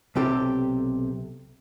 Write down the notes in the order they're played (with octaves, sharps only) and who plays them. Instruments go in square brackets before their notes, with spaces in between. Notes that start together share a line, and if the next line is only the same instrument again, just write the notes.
[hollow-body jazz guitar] B1 C3 G4 A4